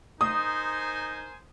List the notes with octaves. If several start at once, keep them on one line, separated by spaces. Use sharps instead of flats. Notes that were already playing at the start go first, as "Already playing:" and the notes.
D#4 A#4 C5 G#5 D#6